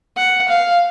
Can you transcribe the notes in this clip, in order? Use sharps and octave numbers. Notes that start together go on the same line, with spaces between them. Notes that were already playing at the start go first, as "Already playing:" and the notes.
F#5
F5